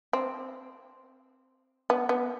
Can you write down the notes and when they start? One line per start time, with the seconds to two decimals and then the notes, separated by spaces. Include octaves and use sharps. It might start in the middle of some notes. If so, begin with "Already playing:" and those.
0.13 C4
1.90 B3
2.09 B3